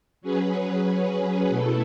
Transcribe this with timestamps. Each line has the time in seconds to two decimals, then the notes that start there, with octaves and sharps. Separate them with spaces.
0.21 F#3 C#4 G#4 B4
1.49 B2 A3 E4 A4